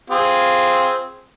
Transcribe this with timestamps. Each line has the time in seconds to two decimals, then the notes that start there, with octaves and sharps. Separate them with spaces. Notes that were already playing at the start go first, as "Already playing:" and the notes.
0.10 C4 F4 G#4